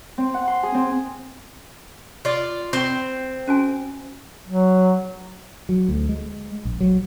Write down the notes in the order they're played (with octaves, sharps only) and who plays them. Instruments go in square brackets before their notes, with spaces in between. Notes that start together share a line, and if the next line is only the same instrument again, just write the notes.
[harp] C4
F#5
C6
G#4
C4
[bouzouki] F4 D5
[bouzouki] C4 [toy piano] F4 G5
[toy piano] C#4 F#4 G#5
[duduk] F#3
[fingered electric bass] F#3
D2
G#3
A#1
F#3